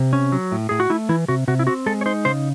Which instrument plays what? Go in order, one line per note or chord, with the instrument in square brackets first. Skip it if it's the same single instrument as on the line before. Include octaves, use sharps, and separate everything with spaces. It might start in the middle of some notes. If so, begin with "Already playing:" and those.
Already playing: [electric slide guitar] C3
C#4
F#3
A2
A2 G#4
F#4
A3 E4
E3 E4
C3 F#4
C3 F#4
E4
C4 F#4
G#3 A4
C#5
D#4 C5
C#3 C5